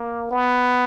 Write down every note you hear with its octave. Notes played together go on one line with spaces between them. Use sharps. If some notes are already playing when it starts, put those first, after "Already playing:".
Already playing: A#3
B3